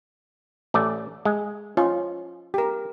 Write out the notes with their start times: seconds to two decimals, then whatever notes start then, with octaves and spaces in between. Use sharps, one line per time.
0.74 A1 A3 D5
1.25 G#3
1.77 C#4 F4 D#5
2.54 G4 A#4